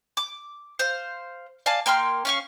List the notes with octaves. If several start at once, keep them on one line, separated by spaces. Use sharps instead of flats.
D6
C5 F5
D5 F5 G#5 A5
A#3 G5 C6 F6
C#4 F5 C#6